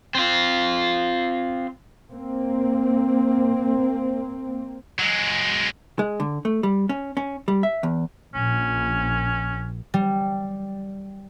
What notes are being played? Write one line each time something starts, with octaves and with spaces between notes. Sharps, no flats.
C4 F4
A#3 C4
F#3 G#3
G#3
D3
A3
G3
C#4
C#4
G3
E5
E2
A#1 C#4
G3